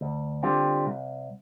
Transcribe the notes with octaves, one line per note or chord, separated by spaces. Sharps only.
D2
D3 G3 C4 F4
C2